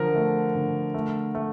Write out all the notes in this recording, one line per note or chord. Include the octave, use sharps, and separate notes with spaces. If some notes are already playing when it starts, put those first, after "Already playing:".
Already playing: D3 F3 A#4
A3
D3
A3
A3